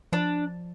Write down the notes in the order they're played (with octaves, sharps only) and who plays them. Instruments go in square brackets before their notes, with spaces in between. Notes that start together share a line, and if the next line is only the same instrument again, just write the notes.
[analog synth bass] F3 [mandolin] D4